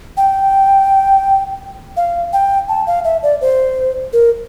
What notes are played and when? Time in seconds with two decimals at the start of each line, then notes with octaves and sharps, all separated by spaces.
0.17 G5
1.97 F5
2.33 G5
2.69 A5
2.87 F5
3.04 E5
3.23 D5
3.41 C5
4.13 A#4